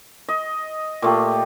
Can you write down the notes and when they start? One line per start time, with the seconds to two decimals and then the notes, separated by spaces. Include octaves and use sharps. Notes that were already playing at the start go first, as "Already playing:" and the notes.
0.29 D#5
1.02 A#2 A3 G4